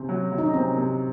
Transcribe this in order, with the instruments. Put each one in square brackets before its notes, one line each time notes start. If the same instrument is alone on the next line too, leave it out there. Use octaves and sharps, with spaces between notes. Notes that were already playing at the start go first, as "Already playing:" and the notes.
Already playing: [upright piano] C3 C4 [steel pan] C#4
[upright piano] F#3
F#3
[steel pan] D#4
C#4
[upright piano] C3 [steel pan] C4
[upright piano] C3